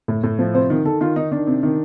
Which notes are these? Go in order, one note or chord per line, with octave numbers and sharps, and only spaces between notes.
A2
A2
F3
C3 C5
D#3
D#3 A4
D#3 F4
D#3 D#4
D#3 D4
C3
D#3